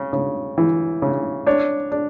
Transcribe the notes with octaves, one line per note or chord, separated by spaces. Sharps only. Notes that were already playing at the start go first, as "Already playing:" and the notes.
Already playing: C#3
C#3
E3
C#3
D4 C#5
D4